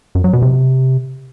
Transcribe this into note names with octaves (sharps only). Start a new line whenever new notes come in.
F#2
F#3
B2
C3